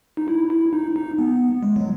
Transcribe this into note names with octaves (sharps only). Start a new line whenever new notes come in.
D#4
E4
E4
D#4
D#4
B3
G#3
F#3